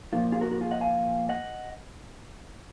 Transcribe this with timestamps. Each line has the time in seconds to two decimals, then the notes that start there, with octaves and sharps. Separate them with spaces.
0.13 A#2 F3 A#3 F4
0.32 F4 G#4
0.41 F#4 A#4
0.51 F#4 A#4
0.61 F4 G#4
0.71 D#5 F#5
0.81 F5 G#5
1.29 D#5 F#5